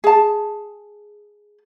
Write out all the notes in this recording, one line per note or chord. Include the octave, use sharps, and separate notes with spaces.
G#4 A5